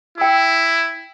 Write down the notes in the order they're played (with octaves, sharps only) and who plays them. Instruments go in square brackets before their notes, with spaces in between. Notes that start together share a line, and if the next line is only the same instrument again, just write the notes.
[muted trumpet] E4 [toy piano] G5 E6